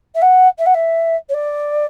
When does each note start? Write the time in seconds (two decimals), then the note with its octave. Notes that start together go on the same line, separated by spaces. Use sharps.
0.14 E5
0.21 F#5
0.58 E5
0.65 F#5
0.74 E5
1.29 C#5
1.34 D5